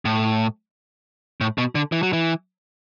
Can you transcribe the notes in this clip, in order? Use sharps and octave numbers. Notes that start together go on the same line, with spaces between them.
A2
A2
B2
D3
E3
F#3
E3